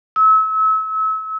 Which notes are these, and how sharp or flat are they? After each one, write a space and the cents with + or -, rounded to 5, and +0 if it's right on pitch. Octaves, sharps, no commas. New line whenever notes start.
E6 -35